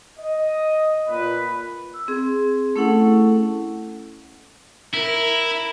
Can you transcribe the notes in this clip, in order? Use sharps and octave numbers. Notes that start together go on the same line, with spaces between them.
D#5
A#2 B4
E6
C4 G#4
A3 C#4 E4 A4 F#5
E4 A#4